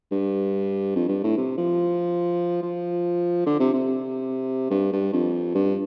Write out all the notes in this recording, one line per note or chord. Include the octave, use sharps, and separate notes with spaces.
G2
F2
G2
A2
C3
F3
F3
D3
C3
C3
G2
G2
F2
G2